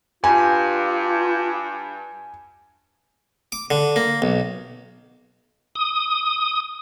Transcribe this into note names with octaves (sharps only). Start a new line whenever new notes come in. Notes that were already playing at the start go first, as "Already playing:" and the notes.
G2 F4 G#5
D6
D3
A#3
B1
D#6